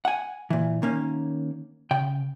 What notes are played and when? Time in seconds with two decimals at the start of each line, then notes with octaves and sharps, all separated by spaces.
0.05 F#5 G#5
0.50 A#2 E3
0.82 D#3 A#3 C#4
1.91 C#3 G5